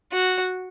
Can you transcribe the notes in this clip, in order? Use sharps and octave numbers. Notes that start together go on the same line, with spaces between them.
F#4